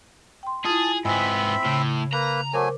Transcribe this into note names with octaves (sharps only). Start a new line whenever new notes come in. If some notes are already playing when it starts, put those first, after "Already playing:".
G5 C6
E4 F4 G#4 A5 D#6
G#2 B3 C4 E5 G#5 B5 D#6
A2 C#3
A#3 B4 A#5
F#3 A3 A#4 C5 G#5 D6